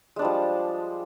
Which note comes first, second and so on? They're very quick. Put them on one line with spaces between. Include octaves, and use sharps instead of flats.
G#3 D4 G3 F3